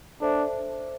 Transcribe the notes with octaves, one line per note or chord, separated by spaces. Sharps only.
D4 A4 C5 E5